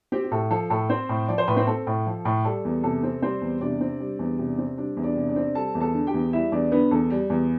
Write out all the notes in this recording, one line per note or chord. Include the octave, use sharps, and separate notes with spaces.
C4 G4
G4
A2 A4
F3 A4
A2 A4
C4 C5
A2
F3 D5
C5
A2 B4
C4 C5
C4 A4
A2
F3
A2
G3 A4
E2
C3 A4
C4
G3 C4 C5
E2
C3 D4 D5
C4
G3
E2
C3
C4
G3 D4 D5
E2
D4 D5
C3
D4 D5
C4
G3 A4 A5
E2
A4 A5
D3
G4 G5
E2
G3 E4 E5
E2 D4 D5
D3 B3 B4
E2 A4
G3
E2